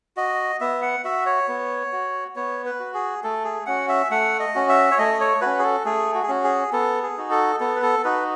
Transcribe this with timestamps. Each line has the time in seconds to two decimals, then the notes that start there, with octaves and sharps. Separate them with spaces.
0.17 F#4 D#5
0.61 B3 E5
0.82 F#5
1.04 F#4 E5
1.26 C#5
1.48 B3
1.92 F#4
2.36 B3 C#5
2.65 B4
2.80 F#4
2.94 G#4
3.24 A3 A4
3.44 G#4
3.66 C#4 F#4 F#5
3.89 E5
4.10 A3 F#5
4.40 D#5
4.55 C#4 F#4
4.69 E5
4.91 C#5
4.98 A3 D#5
5.20 C#5
5.41 C#4 F#4 B4
5.59 G#4
5.64 A4
5.85 A3 G#4
6.15 F#4
6.23 G#4
6.29 C#4 F#4
6.44 G#4
6.73 B3 A4
7.03 G#4
7.17 D#4 F#4
7.31 A4
7.60 B3 A4
7.76 B4
7.82 A4
8.04 D#4 F#4 B4